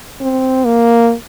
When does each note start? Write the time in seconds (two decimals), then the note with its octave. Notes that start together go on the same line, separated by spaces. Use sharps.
0.20 C4
0.66 A#3